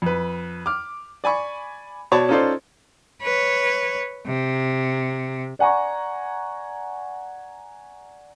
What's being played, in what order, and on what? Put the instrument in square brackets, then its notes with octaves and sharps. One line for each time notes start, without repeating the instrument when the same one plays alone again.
[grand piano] F2 B4
D6 F6
D5 G#5 B5 C#6
B2 C#5 D5 A5
C#4 D#4 F4 A4 C5 D5
[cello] B4 C#5
C3
[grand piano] D5 F#5 G#5 A#5 C#6